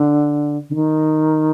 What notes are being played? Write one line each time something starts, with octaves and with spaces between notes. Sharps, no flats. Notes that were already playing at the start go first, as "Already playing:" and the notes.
Already playing: D3
D3
D#3